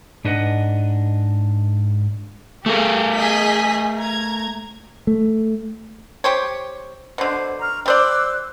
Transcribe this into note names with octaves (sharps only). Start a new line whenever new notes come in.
G#2 D4 B4 D#5 F#5
A3 G4 G#4 A#4
G#4 D#5 B6
A#5 G#6
A3
G4 C5 C#5
B2 D3 C5
A#5 C#6 F6
G3 C5 D5 D6 E6 F#6